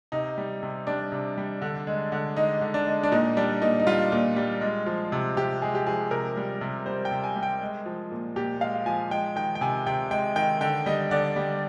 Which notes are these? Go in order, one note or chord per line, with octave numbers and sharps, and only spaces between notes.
C3 D#4
G3
C3
G3 D4
C3
G3
D3
G#3
D3
G#3 D#4
D3
D4
G#3
D4
A#2 D#4
G3 D4
A#2 D#4
D#4
G3 F4
A#2
G3
G#3
F3
C3
C3 G4
G#3 G#4
G4
F3 G#4
C3 A#4
G3
C3
G3 C5
G5
C3
G#5
G3
G5
G#3
F3
A#2
A#2 G4
G#3 F5
F3 G#5
G#3 G5
D#3 G5
G5
C3 G#5
C3 G5
G#3 G5
D#3 G5
D3 G5
G3 D#5
D3 D5
G3